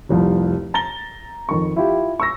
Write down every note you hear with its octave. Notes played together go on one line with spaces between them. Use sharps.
F1 C2 F3
A#5 A6 A#6 G7
F2 D#3 C#6
E4 F4 G4
C#6 E6 A#6